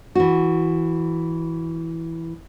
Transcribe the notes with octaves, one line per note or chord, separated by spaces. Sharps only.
E3 F#4